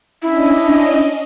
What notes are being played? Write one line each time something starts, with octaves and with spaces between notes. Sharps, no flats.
C#4 D4 E4 D#5